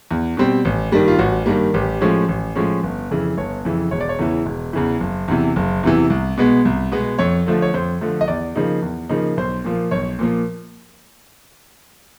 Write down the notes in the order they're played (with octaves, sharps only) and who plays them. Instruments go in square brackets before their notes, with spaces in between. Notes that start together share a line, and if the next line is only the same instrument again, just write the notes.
[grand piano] E2
B2 G3 C4
A1
G2 D#3 G3 A#3
F4
A1 F#4
G2 D#3 G3 A#3
A1 G4
A2 F3 G#3 C#4
A1
A2 F3 G#3 C#4
G1
F2 C#3 E3
G1 C#5
F2 C#3 E3
E1 C#5
D5
C#5
E2 C#3 E3
E1
E2 C#3 E3
F#1
E2 C3 E3
F#1
E2 C3 E3
C2
B2 G#3 B3
C2
B2 G#3 B3
F2 C#5
D3 F3 A3
C#5
F2 C5
D3 F3 A3
D#5
E2 D5
C#3 F3 A#3 D#4
E2
C#3 F3 A#3 D#4
B1 C5
A#2 F3 A#3
B1 C#5
A#2 F3 A#3